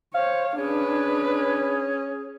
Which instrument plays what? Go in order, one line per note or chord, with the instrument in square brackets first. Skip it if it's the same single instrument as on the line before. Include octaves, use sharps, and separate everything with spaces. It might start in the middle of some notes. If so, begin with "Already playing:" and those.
[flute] C5 [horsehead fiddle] C#5 [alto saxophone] F5
[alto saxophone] C#4 [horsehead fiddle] D4 B4 [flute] G#4